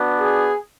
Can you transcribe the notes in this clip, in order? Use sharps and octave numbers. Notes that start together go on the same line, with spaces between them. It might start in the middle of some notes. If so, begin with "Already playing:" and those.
Already playing: B3 D4 F#4
G#4